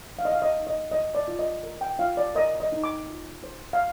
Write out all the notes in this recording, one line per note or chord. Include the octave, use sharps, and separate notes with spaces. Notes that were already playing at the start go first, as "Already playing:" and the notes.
D#4 F5
D#5
F5
D#5
D#4
D#5
C5 D#5
D5
F4
D#5
A#4
G5
F4 F5
D5
A#4 D#5
D#5
D#4
D6
F4
C5
F5